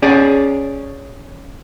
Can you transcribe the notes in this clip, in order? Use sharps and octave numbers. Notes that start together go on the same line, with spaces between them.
C#4 G#4 D5